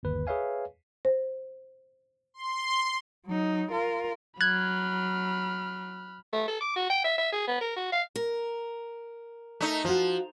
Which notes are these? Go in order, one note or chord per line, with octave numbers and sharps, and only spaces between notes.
G1 D#2 B4
G#4 B4 C#5 E5 F5 G#5
C5
C6
F#3 D#4
F4 A#4
F#3 B5 F6 F#6 G#6
A3
A4
D6
F#4
G5
E5
E5
G#4
B3
A#4
F#4
F5
A#4
A3 D#4
F3 F4 F#4